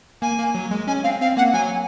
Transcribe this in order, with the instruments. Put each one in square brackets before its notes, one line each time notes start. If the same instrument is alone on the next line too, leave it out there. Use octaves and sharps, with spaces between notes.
[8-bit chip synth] A#3 [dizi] G#5
[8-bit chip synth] A#3
F#3
G#3
[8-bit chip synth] C#4 [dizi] G#5
[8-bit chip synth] C4 [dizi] F5
[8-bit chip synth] C4 [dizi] F5
[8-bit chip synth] A#3 [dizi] F#5
[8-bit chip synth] F#3 [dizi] G#5